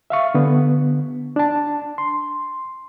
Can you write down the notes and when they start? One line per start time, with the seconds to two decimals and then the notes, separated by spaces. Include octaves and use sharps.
0.10 E5 F5 C#6
0.34 D3 B3
1.36 D4 A5
1.98 C6